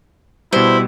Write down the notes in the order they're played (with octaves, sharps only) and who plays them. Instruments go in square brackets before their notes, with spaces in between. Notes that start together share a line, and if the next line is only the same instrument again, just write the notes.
[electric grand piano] B2 G3 [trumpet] E4 [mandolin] C5